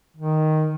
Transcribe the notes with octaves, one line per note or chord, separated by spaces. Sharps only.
D#3